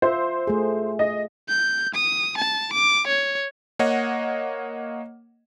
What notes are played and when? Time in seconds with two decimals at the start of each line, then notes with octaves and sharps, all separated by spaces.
0.02 F4 C5 E5
0.47 A3 G#4
0.99 D#5
1.49 G6
1.95 D#6
2.38 A5
2.73 D6
3.07 C#5
3.79 A#3 C#5 D#5 F#5